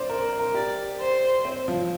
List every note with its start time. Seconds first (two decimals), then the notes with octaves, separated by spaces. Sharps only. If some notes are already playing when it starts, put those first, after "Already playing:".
Already playing: C5 D5
0.10 A#4
0.40 A#4
0.54 G4 D5
1.00 C5
1.45 C4
1.68 F3